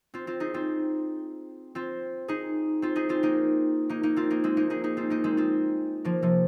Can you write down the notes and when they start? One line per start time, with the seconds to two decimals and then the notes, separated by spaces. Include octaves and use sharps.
0.14 C4 F4
0.27 C4 F4
0.40 D#4 G#4
0.54 C4 F4
1.75 C4 F4
2.28 D#4 G#4
2.82 C4 F4
2.96 D#4 G#4
3.09 C4 F4
3.23 A#3 D#4
3.89 A#3 D#4
4.03 A#3 D#4
4.16 C4 F4
4.30 A#3 D#4
4.44 G#3 C4
4.57 A#3 D#4
4.70 D#4 G#4
4.84 D#4 G#4
4.97 C4 F4
5.10 A#3 D#4
5.24 G#3 C4
5.37 C4 F4
6.05 F3 A#3
6.22 C3 F3